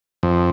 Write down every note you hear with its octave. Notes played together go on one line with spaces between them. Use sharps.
F2